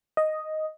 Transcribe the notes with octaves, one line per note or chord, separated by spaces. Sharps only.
D#5